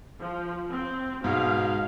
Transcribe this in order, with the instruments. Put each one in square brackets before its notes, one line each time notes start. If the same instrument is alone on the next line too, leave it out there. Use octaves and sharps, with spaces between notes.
[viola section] F3
C4
[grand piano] G#2 B2 [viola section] F5